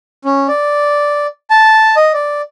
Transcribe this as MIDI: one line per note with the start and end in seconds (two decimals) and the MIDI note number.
0.25 0.47 61
0.48 1.26 74
1.50 1.95 81
1.96 2.12 75
2.13 2.42 74